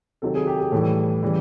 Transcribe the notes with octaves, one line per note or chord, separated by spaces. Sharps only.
C3 D#3 F#3 A4
G#4
G4
G#4
A2 E3 G3 A4
C#3 E3 G3